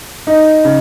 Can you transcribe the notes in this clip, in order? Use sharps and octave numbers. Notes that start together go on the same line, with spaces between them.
D#4
C#3